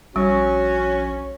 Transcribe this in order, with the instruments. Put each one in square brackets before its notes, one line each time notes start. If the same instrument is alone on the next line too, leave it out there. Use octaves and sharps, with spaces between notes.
[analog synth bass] A#1 [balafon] G3 [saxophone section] C#4 [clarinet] F#4